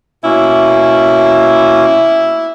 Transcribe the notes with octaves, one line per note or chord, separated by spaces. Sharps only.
B2 A#3 C#4 E4